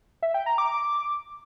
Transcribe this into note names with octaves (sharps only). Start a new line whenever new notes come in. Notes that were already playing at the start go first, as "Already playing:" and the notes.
E5
G5
A#5
D6